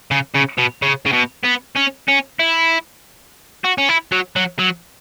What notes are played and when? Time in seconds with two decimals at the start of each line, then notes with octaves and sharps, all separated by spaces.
0.11 C#3
0.34 C#3
0.58 B2
0.82 C#3
1.06 C#3
1.13 B2
1.45 B3
1.76 C#4
2.08 C#4
2.40 E4
3.65 F#4
3.78 C#4
3.89 E4
4.12 F#3
4.36 F#3
4.59 F#3